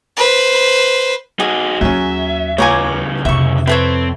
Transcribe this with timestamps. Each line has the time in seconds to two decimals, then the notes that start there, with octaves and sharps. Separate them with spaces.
0.17 B4 C5
1.40 D#4 F#4 G#4
1.81 D#2 F#3 C#4 E5
2.58 C#2 A2 C#3 C#5 G#5 A#5 D6
3.25 F2 C3 E5 C#6
3.67 C4 E4 A4 B4 C#5